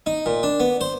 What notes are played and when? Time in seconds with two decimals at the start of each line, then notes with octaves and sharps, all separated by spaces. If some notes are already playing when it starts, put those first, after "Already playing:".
0.06 D#4
0.26 A#2
0.43 D4
0.60 B3
0.81 C5